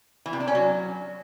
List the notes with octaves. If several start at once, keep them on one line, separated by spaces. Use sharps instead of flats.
E3
C3
D4
C#4
F#3